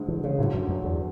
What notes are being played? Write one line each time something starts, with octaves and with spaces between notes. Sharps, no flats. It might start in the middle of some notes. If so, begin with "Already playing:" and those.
Already playing: D2 D3 G#3
E3
C#3
D2 A2 D3 F#3
F#2
F#2
E2